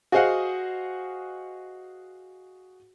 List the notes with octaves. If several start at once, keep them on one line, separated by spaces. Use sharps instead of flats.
F#4 G#4 C5 D#5 F5 F#5